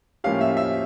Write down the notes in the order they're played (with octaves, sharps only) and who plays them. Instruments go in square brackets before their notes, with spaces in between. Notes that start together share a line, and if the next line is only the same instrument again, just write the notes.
[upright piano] A2 F3 A#3 C#4 G4 [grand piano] F5
[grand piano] E5
E5